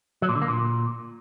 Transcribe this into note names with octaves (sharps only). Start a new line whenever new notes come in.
F#3
A#2
D3
A#3
A#2